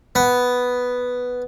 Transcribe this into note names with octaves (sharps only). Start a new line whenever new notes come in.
B3